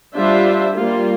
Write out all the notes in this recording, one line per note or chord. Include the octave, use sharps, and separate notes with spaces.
G3 D4 F4 C5 E5
G3 A#3 F4